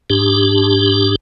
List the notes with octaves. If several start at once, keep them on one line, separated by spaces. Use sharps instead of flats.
G#2 D4 G4